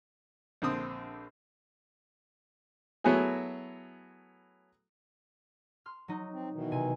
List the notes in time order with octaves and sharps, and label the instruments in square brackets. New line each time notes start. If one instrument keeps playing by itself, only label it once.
[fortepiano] A#1 D3 C4 D#6
F#3 A3 B3 E4 F#4 G#4
[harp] C6 F6
F#3 D#4
[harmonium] C4
B2 D#3 E3
[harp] C3 G#5